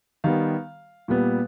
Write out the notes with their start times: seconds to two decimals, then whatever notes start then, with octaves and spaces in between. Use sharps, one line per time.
0.24 D#3 G3 B3 F5
1.08 A#2 G3 B3